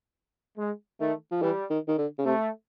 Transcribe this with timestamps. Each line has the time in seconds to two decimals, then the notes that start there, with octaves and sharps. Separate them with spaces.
0.58 G#3
1.00 D#3 A3
1.31 F3
1.42 E3 G3
1.70 D#3
1.88 D#3
1.98 D3
2.19 C#3
2.25 C3 A3